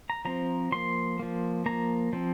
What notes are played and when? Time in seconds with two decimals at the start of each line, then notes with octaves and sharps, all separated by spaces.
0.10 A#5
0.25 F3 C4 A#5
0.72 F3 A#3 C6
1.19 F3 A#3
1.66 F3 A#3 A#5
2.13 F3 C4